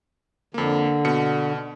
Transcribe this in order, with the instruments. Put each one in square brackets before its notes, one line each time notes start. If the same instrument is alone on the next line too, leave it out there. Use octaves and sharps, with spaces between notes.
[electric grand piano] F2 A#3 [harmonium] D3
[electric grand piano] B2 C#7